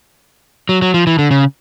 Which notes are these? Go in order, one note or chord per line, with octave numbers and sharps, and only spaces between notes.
F#3
F#3
F3
E3
D3
C#3